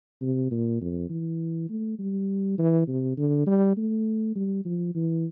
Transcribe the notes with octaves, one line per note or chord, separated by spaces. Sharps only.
C3
A#2
F2
E3
A3
G3
E3
C3
D3
G3
A3
G3
F3
E3